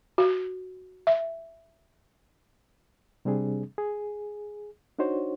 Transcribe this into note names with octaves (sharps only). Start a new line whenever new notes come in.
F#4
E5
C3 G3 C4 D4 G#4
G#4
D4 D#4 F#4 C5 C#5